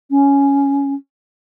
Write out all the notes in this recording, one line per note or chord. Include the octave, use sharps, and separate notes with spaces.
C#4